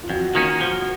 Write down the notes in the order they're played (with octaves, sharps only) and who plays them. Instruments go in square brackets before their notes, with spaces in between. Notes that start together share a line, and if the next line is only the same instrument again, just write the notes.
[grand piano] F4
[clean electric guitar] F2 [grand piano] F#4
[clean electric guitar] D#3 A#3 C#4
[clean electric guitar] F3 [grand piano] F#4